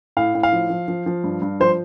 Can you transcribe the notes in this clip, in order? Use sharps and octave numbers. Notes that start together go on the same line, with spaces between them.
A2 F5
A2
F5
F3
F3
F3
F3
G2
G2
F3 C5